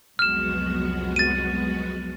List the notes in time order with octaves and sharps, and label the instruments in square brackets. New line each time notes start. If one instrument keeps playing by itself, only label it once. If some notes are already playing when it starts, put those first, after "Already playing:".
[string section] C2 F2 F#3 [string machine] G#3 B3 F#4 [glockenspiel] F6 E7
[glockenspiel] A6 D#7